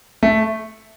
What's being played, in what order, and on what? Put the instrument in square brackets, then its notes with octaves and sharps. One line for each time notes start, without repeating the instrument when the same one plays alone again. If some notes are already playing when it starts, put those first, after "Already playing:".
[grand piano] A3